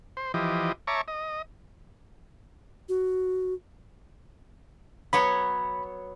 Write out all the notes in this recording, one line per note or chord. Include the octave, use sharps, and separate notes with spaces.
C5
E3 F3 G4 D#5
C#5 E5 A5 A#5 C#6 D6
D#5
F#4
F#3 B3 C#5 B5